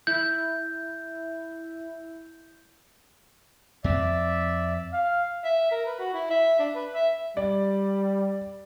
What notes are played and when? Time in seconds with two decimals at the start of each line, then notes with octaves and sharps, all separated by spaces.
0.07 E4 G6
3.84 F2 C4 D5 E5
4.93 F5
5.45 E5
5.71 A#4
5.86 B4
5.99 F#4
6.13 E4
6.31 E5
6.59 D4
6.75 B4
6.95 E5
7.37 G3 D5